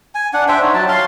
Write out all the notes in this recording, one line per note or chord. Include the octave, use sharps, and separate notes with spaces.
G#5
D4 F#5
C5 E5 G5
D#4 C#5
F#3 A5
F5 C6